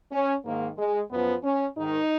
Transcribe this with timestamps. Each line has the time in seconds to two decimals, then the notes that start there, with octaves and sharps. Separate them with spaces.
0.12 C#4
0.45 G#2 D#3 A#3
0.78 G#3
1.11 F#2 F3 B3
1.43 C#4
1.76 G#2 D#3 D#4